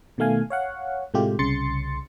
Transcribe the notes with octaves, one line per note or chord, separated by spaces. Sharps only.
B2 D#3 A3 F5 G#5
C#5 F5 F#5
A2 C3 G#3 A3 F4 G4
C2 C#3 C6 A6 C#7